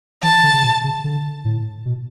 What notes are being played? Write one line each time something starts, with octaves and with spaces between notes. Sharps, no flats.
E3 A5
D3
C#3
B2
C#3
D3
A2
B2